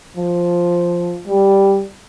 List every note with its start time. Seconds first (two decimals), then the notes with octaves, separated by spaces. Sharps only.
0.17 F3
1.27 G3